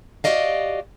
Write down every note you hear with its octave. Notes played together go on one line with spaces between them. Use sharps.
F#4 G4 D5 D#5 F5